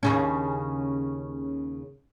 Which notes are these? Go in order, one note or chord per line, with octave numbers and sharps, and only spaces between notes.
D#2 C#3 C#4